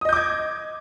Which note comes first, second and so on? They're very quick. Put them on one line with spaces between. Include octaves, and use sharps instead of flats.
D#6 D#5 G6 D6 G#6